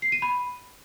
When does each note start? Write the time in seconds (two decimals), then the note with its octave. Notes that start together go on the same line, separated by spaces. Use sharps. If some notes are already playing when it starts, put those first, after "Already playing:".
0.02 C7
0.12 D#7
0.22 B5